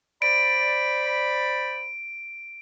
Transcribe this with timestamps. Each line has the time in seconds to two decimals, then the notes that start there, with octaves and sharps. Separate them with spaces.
0.22 C5 D5 B5 D7